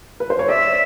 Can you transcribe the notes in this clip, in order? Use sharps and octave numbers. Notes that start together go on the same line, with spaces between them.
B4
C5
C#5
D5 E5